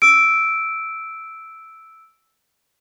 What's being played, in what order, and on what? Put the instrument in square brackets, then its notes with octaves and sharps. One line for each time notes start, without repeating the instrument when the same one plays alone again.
[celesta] E6 D7